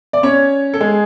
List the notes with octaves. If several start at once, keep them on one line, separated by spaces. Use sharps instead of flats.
D5
C#4 C#5
A4
G#3 G#4